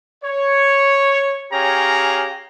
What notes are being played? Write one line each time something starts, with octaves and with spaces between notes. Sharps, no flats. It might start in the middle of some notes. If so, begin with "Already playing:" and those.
C#5
C#4 G4 G#4 C#5 F5 A#5